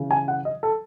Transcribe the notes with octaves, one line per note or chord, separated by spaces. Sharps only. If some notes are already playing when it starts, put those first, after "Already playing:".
Already playing: C#3 E3
G#5
F#5
D#5
A4